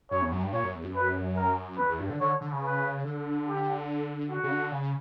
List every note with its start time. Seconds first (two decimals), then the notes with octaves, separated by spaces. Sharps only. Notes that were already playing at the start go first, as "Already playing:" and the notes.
0.11 F#2 C#5
0.21 E2
0.32 F#2
0.43 G2
0.52 A#2 C#5
0.63 F#2
0.74 E2
0.84 F#2
0.95 B4
1.37 A#4
1.78 E2 B4
1.89 E2
2.00 G2
2.10 D3
2.20 D3 C#5
2.41 D3
2.52 C#3
2.63 B4
3.04 D3
3.47 G4
4.29 F#4
4.43 C#3
4.51 D3
4.71 C#3